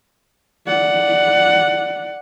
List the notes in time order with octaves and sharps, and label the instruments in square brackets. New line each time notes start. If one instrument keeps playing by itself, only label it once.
[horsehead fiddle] D5 F#5